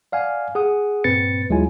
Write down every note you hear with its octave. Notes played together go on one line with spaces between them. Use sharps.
D5 F5 F#5 G#5
G#4 F#5 D#6
G2 A#2 C4 B4 A6 C#7
D#2 F#3 G#3 E4 F4 G#5